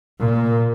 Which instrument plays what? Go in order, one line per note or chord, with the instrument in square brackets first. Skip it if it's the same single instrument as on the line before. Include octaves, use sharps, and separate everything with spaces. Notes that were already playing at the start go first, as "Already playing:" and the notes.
[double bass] A#2